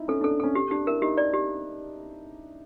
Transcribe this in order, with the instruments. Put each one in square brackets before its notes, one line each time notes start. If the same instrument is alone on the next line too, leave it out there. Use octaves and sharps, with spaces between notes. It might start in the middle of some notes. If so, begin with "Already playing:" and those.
Already playing: [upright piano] D#4 E4
[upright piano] C#4 [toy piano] A4
[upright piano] D4
[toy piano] A4
[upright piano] D4
[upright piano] C#4 [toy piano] A4
[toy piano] G4
[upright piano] D4 [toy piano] G4
[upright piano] E4 [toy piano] A#4
[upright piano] D#4 [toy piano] G4
[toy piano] D5
G4